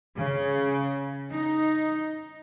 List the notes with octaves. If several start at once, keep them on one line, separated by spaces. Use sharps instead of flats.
C#3
D#4